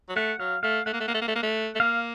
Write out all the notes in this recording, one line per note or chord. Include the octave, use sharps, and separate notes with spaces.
F#3
A3 F#5
F#3 F5
A3 F5
A3 F#5
A#3
A3
A#3
A3
A#3
A3
A#3
A3
A3
A#3 F5